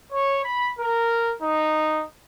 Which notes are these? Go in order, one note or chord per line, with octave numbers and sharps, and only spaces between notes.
C#5
B5
A#4
D#4